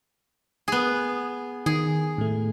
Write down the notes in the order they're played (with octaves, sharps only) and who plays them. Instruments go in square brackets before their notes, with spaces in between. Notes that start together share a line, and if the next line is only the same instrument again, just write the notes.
[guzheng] B3 G#4
[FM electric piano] D#3 [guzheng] G#4
[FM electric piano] A2 A3